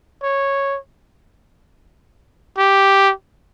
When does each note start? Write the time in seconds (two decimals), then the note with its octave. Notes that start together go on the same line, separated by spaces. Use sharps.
0.23 C#5
2.58 G4